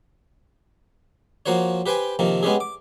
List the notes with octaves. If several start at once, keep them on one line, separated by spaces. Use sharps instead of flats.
F3 A#3 F#4 C5 C#5
G4 B4 C5 G5 G#5
C3 D#3 F3 A#3
G#3 B3 C#4 G4 G#4
D6